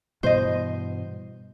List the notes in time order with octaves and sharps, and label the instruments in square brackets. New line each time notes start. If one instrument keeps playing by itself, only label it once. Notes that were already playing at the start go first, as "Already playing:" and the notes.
[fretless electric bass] G2 B2 E3 [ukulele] C5 D#5